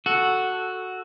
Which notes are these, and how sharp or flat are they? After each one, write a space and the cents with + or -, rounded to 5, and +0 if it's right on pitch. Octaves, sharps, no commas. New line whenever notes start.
F#4 +0 A4 +0 F#5 +0